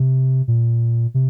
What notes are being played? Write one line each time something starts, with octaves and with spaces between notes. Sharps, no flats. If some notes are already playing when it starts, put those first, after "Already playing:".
Already playing: C3
A#2
C3